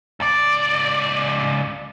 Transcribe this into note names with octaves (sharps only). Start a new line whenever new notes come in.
C#2 D5